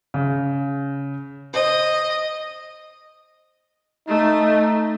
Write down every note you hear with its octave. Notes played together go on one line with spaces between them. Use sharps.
C#3
C5 D#5
A3 D#4